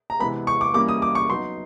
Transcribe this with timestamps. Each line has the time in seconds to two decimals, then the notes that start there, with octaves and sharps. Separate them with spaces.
0.10 A#5
0.19 C3 E3 G#3 B3 B5
0.47 C#6
0.61 D6
0.74 E3 G3 A#3 C#4 D6
0.88 D#6
1.02 D6
1.15 C#6
1.30 F#3 B3 D#4 C6